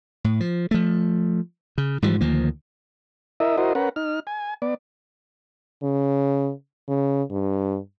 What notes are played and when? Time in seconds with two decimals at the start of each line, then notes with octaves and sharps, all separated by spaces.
0.24 A2
0.40 F3
0.71 F3 A3
1.78 C#3
2.02 G#2 E3 F3 G3
2.21 D2 D#3 F3 A#3
3.40 E4 A#4 D#5 E5
3.57 E4 F#4 A#4 C5 D#5
3.75 C#4 A#4 B4 F#5
3.96 D#4 F6
4.27 G#5
4.62 B3 D5
5.83 C#3
6.88 C#3
7.31 G2